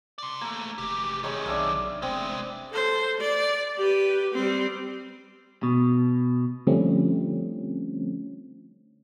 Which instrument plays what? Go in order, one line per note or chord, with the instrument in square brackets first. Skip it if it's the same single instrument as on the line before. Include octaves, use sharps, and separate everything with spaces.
[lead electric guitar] D5 C6
[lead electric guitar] A3 A#3 [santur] A#5
[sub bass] F1 [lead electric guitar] E3 G4
[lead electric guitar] C3 D#3 [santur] G#3 C#5 B5
[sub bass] B1 [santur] D4 E5 F5
[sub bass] F1 [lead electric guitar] G#3 B3 [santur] C4
[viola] A4 C5
D5
G4 B4
G3 C4
[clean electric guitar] B2
[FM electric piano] D3 F3 G3 A3 C4 C#4